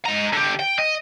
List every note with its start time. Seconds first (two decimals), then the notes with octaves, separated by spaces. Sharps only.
0.06 G#3 A#5
0.33 D3 G4
0.60 G5
0.79 D#5